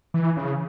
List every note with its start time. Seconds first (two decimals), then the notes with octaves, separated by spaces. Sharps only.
0.14 E3
0.37 C#3